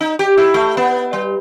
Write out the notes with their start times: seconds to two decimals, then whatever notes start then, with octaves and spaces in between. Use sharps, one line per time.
0.01 D#4
0.19 G4
0.37 E4
0.54 A3
0.77 B3
1.13 G3